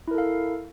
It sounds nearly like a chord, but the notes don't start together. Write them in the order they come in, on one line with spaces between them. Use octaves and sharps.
E4 A#4 A4 F5